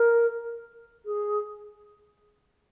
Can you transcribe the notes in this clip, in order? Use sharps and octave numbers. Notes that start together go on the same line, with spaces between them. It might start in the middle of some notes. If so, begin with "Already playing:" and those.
Already playing: A#4
G#4